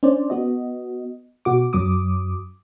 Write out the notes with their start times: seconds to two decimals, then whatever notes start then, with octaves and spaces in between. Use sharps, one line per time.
0.03 C#4 D4 C5 D5
0.30 B3 F#4 D#5
1.45 B2 F#4 D6
1.73 F#2 F#3 D6 D#6